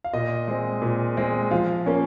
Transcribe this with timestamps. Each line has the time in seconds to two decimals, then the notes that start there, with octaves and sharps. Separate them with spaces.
0.04 F5
0.13 A#2 D#5
0.48 G#3 C4
0.82 A#2
1.17 G#3 C4
1.51 F3 F5
1.86 A#3 C#4